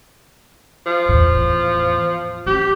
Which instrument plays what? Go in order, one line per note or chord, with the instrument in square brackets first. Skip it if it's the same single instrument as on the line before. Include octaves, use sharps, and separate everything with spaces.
[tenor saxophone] F3
[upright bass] E2 A2
[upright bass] A3 C#4 [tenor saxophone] G4